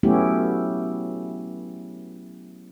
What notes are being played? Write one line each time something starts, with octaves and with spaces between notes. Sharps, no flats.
F#3 A3 B3 C#4 E4 G4